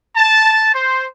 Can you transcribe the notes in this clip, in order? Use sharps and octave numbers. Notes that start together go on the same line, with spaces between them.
A5
C5